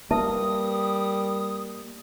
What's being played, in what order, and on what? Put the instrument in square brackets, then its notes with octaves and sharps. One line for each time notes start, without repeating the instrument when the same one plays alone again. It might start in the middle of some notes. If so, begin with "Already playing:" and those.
[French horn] G3 [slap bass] A#3 [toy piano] B4 E5 A5 [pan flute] D#6